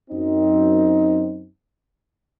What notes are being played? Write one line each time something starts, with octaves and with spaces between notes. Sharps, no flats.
F#2 C4 D#4